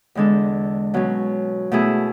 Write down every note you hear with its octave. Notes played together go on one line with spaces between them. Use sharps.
E2 D3 G#3 D4 A4
B2 F#3 C#4
B2 A3 E4 G#4